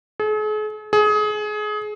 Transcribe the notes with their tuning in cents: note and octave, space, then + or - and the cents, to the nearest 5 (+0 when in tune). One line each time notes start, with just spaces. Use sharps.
G#4 +45
G#4 +25